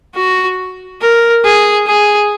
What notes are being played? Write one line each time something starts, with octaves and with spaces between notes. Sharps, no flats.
F#4
A#4
G#4
G#4